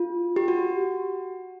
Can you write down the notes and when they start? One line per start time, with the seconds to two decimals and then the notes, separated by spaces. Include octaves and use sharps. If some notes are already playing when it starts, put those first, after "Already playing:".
Already playing: F4
0.36 G4
0.48 F#4